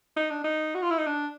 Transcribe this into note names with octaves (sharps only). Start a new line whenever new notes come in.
D#4
D4
D#4
F#4
F4
E4
D#4
D4